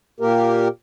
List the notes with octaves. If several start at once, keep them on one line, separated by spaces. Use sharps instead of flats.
A#2 A#3 G4 A#4